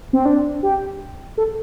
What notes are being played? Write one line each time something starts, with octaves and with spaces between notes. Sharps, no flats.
C4
D4
G4
A4